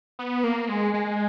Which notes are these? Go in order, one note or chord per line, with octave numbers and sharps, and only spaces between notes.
B3
A#3
G#3
G#3